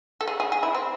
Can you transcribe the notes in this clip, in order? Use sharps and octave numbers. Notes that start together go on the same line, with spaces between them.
A4
G#4
G#4
G#4
E4
C4